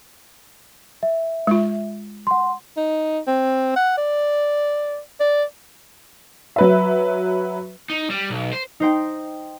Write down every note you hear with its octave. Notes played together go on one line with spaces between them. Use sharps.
E5
G#3 F4
F#5 C6
D#4
C4
F#5
D5
D5
F#3 B4 E5
D#4
G3
B1
C5
D#4 C5 G5